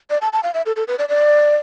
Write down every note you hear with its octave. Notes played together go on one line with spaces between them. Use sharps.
D5
A5
A5
F5
E5
A4
A4
B4
D5
D5